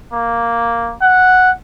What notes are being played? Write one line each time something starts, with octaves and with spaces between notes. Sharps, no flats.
A#3
F#5